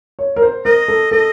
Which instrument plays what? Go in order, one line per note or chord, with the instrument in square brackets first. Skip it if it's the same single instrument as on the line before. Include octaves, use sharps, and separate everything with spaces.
[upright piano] C#5
A#4
C5
[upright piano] A#4 [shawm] D#5
[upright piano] A4
[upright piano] A4 [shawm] D#5